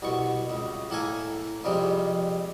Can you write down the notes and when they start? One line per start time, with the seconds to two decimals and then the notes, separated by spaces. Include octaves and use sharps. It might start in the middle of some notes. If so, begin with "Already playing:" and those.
0.02 C2 B2 C#6
0.50 C#2
0.90 A2 A#3 A4 G#5
1.64 F2 C3 G3 G#3